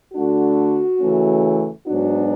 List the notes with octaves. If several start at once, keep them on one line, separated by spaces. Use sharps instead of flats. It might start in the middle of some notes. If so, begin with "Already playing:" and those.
D3 A3 D4 F#4
C#3 E3 A3 C#4
G#2 F#3 B3 D4 F#4